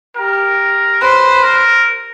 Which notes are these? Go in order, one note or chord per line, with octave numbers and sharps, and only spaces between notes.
G4 A#4
B4 C5
A#4